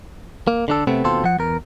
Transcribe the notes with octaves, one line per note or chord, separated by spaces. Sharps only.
A#3
D3 D4 A4
C3 A3 B3 C4
D#2 B2 C4 F4 A4 C6
F3 F#5
E2 A#4